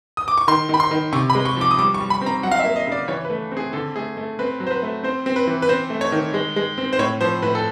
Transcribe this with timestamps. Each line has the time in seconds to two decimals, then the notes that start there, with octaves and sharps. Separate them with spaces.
0.17 D#6
0.28 D6
0.38 C#6
0.48 D#3 C6
0.69 D#3 B5
0.80 C6
0.91 D#3
1.12 C3 C#6
1.30 B5
1.35 G#3
1.45 C#6
1.57 F3 D6
1.71 D#6
1.79 G3 D6
1.94 C#6
2.00 G3
2.10 B5
2.21 C4 A#5
2.43 F#3 F#5
2.51 F5
2.60 E5
2.65 A#3
2.76 D#5
2.87 C#3 D5
3.08 E3 C#5
3.25 B4
3.30 A3
3.51 C4
3.57 G#4
3.73 D3 A4
3.96 A3 G#4
4.17 A3
4.39 C4 B4
4.60 F#3
4.67 C5
4.71 B4
4.82 A3
5.03 C4 C5
5.26 C4
5.36 B4
5.47 E3
5.62 B4
5.69 C4 C5
5.90 A3
6.01 C#5
6.12 D#3
6.34 G#3
6.56 G#3
6.78 C4
6.93 C5
6.99 A2 C#5
7.21 F3 C5
7.42 A2 B4
7.55 A4